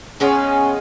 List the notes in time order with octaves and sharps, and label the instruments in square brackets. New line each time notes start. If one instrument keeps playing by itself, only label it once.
[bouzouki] G#3 B3 F4 [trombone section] C#4